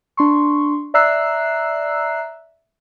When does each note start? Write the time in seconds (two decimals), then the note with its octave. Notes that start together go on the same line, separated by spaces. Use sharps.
0.17 D4 C6 C#6
0.94 D5 E5 A#5 E6 F#6 C7